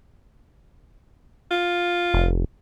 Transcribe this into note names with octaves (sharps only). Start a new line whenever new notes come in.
F4
F1